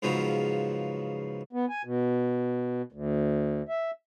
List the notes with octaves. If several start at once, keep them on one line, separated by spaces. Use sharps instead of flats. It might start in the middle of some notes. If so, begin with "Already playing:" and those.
G#2 C#3 F3 F#3 B3
B3
G#5
B2
D2
E5